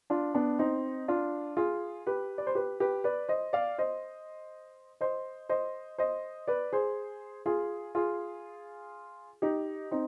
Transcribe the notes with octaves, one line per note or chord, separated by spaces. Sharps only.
D4 F4
B3 D4
C4 D#4
D4 F4
F4 G#4
G4 B4
D5
C5
G4 B4
G4 B4
B4 D5
C5 D#5
D5 F5
C5 D#5
C5 D#5
C5 D#5
C5 D#5
B4 D5
G#4 C5
F4 G#4
F4 G#4
D#4 G4
C4 D#4